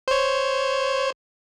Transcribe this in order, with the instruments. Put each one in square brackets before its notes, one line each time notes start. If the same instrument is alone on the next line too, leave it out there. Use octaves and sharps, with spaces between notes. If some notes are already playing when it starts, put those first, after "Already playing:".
[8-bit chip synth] C5 C#5